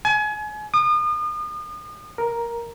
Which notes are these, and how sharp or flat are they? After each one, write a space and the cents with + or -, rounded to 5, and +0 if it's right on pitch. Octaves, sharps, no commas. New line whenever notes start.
G#5 +30
D#6 -40
A#4 +5